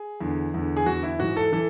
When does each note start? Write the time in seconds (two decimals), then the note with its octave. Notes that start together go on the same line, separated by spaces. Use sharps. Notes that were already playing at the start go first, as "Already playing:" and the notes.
Already playing: G#4
0.21 E2 D3
0.54 E2 D3
0.77 G#4
0.86 E2 F#4
0.91 D3
1.03 E4
1.19 G#2 E3 F#4
1.36 A4
1.52 E3 A4